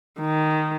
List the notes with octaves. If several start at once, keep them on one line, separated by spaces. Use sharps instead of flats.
D#3